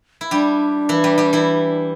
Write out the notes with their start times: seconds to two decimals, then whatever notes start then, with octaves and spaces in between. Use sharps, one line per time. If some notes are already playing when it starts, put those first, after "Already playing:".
0.21 E4
0.31 G3 D4 G4
0.89 E3 E4
1.04 G3 G4
1.18 G3 G4
1.33 E3 E4